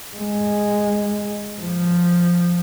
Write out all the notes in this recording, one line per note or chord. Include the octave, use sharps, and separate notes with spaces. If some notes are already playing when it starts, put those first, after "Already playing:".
G#3
F3